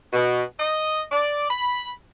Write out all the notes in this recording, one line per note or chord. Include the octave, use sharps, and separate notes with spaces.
B2
D#5
D5
B5